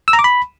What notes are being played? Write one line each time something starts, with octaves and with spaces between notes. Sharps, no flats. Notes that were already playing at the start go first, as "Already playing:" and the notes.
E6
A#5
D6
B5